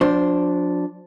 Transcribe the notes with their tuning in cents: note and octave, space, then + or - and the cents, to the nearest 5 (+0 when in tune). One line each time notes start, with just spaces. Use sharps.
F3 +45 D4 -10 C5 +0